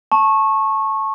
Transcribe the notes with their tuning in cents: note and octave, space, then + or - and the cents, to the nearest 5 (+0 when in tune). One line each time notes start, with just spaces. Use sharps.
A5 +0 C#6 -20